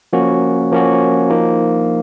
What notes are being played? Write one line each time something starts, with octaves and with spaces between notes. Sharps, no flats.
F3 A#3 C#4 F#4
F3 A#3 C#4 F#4
F3 A#3 D#4